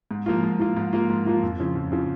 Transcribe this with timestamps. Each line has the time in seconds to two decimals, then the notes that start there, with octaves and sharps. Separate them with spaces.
0.11 G#2
0.26 F3 A#3 F4
0.43 G#2
0.59 F3 A#3 F4
0.77 G#2
0.93 F3 A#3 F4
1.10 G#2
1.26 F3 A#3 F4
1.43 F2
1.60 C#3 F3
1.76 F2
1.92 C#3 F3